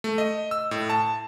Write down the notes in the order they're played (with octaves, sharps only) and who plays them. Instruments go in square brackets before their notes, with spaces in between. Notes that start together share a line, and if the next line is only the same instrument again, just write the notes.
[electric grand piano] A3
D#5
E6
A2
A5